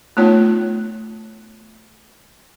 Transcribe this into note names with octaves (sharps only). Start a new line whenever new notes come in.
A3 B3 D#4 F4 C#5